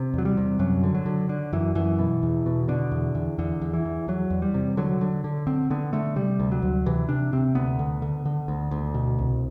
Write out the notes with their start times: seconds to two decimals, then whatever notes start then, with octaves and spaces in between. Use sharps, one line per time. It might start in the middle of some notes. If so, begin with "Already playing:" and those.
Already playing: C3
0.14 E2 F#3
0.25 G3
0.37 C3
0.59 F#2 F#3
0.83 D3
0.95 F#3
1.06 D3
1.29 D3
1.53 F#2 E3
1.75 F#2 E3
1.99 B2
2.23 E2
2.46 B2
2.68 B2 D3
2.91 E2
3.15 E2
3.38 E2 D3
3.61 E2
3.74 E3
3.85 E2
4.08 E2 F#3
4.30 E2
4.42 G3
4.54 C3
4.77 D3 F#3
5.01 D3
5.24 D3
5.47 D3 C4
5.70 D3 B3
5.93 D3 A3
6.16 C3 G3
6.40 D2
6.52 F#3
6.62 D2
6.86 C3 E3
7.09 C3 D4
7.33 C3 C4
7.55 D2 B3
7.79 D3
8.02 D3
8.25 D3
8.48 D2
8.71 D2
8.94 B2
9.18 C2